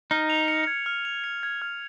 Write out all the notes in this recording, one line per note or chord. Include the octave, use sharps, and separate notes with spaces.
D#4 F6
F7
C#7
G#6
F6
F7
C#7
G#6
F6